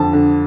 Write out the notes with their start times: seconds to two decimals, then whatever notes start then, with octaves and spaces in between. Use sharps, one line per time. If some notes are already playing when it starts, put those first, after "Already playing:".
Already playing: F2 D3 A5
0.13 D3